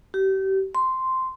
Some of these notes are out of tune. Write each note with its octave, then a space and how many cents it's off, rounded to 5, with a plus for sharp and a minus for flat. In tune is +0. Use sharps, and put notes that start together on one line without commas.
G4 -30
C6 -5